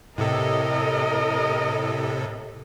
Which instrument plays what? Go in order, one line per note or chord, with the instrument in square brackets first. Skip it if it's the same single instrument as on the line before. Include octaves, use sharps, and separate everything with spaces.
[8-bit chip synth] A2 C3 A4 [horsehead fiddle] A#4 D#5